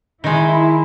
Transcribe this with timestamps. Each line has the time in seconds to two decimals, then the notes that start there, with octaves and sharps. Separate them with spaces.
0.24 D#3 G#3 E4